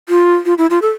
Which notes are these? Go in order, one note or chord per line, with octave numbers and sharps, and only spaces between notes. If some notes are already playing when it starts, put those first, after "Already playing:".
F4
F4
E4
F4
A4